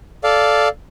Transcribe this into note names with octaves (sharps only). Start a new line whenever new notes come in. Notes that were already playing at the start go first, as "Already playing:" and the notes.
A4 D5 F5